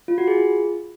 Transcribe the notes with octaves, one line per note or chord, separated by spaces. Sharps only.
F4
F#4
G#4
F4